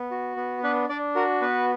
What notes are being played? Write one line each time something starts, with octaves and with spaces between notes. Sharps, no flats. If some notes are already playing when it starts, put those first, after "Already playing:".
Already playing: B3
F#4
B3
D4 B4
D4 D5
F#4 A#4
B3 B4